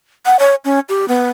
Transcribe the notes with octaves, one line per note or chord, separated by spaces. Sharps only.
F#5
C#5
C#4
G4
B3